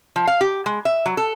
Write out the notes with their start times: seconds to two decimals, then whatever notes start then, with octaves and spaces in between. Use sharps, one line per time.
0.16 F3
0.27 F5
0.41 G4
0.66 G#3
0.85 E5
1.06 F#3
1.17 A4